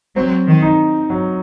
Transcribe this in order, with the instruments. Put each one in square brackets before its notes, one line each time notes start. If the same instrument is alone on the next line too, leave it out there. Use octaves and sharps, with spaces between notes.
[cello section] F#3 [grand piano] C4
[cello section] D#3
[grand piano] D#4
F#3